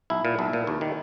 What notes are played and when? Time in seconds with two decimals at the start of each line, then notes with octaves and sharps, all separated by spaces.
0.10 B1 E4
0.25 A#2
0.39 B1
0.53 A#2
0.67 D#2
0.81 D#3